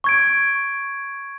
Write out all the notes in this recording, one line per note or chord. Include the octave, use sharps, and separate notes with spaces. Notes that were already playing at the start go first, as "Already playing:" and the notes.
C#6 G#6 D7